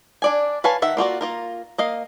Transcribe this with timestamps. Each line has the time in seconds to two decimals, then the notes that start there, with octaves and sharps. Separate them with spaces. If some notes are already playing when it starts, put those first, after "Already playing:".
0.22 D4 D5 G#5
0.64 B4 C#5 F5 G#5 A5
0.82 D#3 E5 F#5
0.97 A#3 F4 F#4 D5
1.21 A#3 F4 A#4
1.78 A#3 D#5 F5